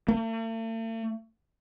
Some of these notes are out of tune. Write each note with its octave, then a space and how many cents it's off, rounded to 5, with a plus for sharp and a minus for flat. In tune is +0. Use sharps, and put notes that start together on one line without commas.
A3 +45